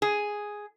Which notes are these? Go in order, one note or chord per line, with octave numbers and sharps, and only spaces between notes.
G#4